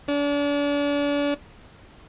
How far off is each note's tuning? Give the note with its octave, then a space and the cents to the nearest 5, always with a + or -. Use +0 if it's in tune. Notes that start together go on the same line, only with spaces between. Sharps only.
D4 -40